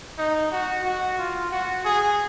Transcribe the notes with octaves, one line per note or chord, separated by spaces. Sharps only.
D#4
F#4
F#4
F4
F#4
G#4